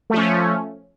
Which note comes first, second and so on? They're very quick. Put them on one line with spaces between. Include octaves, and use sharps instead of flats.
A3 F3 C#4